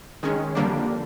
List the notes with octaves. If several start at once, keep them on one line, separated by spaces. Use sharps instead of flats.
D#3 G#3 C#4
F2 D3 G3 A#3 D4